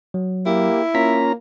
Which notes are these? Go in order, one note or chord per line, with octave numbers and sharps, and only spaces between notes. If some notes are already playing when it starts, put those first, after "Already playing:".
F#3
A#3 E4 G4
A#3 C#4 F4 A#5 B6